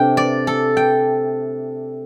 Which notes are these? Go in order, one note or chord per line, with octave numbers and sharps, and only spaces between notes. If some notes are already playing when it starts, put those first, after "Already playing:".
Already playing: C3 A3 D4 G5
D5
A4
G5